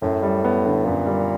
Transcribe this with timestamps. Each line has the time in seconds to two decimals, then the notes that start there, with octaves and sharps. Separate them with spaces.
0.02 F#2 A2
0.23 G3
0.45 B3
0.66 D3
0.86 F#2 A#2
1.06 G3